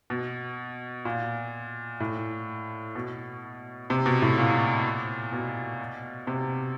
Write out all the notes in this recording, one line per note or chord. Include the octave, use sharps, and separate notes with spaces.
B2
A#2
A2
B2
C3
B2
A2
A#2
B2
C3